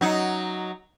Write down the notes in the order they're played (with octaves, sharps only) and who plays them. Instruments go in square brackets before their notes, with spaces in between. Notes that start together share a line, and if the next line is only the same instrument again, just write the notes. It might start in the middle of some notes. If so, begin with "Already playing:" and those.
[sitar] F#3 D#4